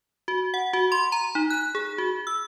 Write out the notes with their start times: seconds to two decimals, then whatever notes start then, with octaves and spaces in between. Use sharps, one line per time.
0.28 F#4
0.54 F#5
0.73 F#4
0.92 C6
1.12 A#5
1.35 D#4
1.50 F#6
1.75 G#4
1.98 F#4
2.27 E6